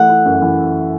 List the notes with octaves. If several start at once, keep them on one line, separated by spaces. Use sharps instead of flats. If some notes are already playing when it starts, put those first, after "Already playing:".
Already playing: E3 A3 F#5
E4
F#2
E3